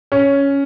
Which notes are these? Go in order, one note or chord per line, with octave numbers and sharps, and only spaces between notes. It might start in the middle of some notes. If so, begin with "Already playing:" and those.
C#4